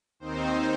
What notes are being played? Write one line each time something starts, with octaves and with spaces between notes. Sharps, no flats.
D#2 D#3 C4 D#4 C5